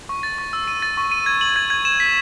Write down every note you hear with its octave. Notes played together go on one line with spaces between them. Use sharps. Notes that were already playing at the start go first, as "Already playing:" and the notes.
C#6
A6
C#6
E6
D#7
A6
C#6
D#7
G#6
F#7
G#6
G#6
E7
B6